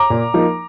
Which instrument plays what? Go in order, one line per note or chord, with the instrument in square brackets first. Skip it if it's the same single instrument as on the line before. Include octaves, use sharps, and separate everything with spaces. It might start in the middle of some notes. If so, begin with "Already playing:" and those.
Already playing: [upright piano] A#5 D6
A#2
F3 A#3 D#4